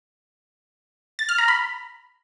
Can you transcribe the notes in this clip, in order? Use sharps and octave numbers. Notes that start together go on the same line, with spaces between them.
A6
F6
A#5
B5